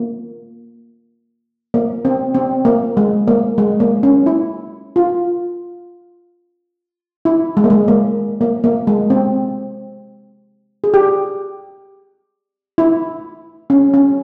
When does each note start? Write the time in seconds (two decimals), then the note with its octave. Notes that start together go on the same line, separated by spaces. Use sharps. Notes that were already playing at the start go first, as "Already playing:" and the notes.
Already playing: A#3
1.74 A#3
2.05 C4
2.34 C4
2.65 A#3
2.97 G#3
3.28 A#3
3.58 G#3
3.80 A#3
4.03 C#4
4.26 E4
4.96 F4
7.25 E4
7.57 G#3
7.64 A#3
7.70 G#3
7.88 A#3
8.41 A#3
8.64 A#3
8.87 G#3
9.10 C4
10.84 G#4
10.94 G4
12.78 E4
13.70 C#4
13.94 C#4